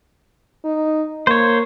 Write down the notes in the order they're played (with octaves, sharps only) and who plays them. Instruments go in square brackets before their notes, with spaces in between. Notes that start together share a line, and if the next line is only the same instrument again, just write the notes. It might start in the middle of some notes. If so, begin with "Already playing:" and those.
[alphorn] D#4
[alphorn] A#3 [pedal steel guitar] C5 C#5